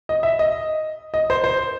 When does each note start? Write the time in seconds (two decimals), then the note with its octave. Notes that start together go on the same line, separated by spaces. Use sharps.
0.09 D#5
0.23 E5
0.39 D#5
1.14 D#5
1.30 C5
1.44 C5